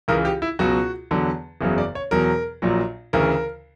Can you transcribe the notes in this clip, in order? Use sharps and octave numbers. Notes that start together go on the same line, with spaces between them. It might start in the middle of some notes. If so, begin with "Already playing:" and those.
C#2 C#3 E3 A#4
G4
E4
C#2 B2 F#3 F#4
E2 D3 F#3
F#1 E2 C#3 F#3
D5
C#5
E2 B2 F#3 A#4
A#1 A#2 F#3
D2 C#3 E3 A#4